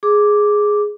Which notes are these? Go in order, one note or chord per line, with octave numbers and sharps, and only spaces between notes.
G#4 D6